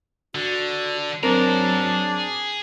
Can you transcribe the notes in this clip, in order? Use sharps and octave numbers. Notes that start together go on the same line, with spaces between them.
D3 F#4
F#3 C4 D4 G#4 A#4 A#5